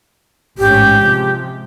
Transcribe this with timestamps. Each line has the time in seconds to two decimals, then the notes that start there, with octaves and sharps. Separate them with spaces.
0.58 A1 G#2 C#4 G4
1.01 C3 F3 G#3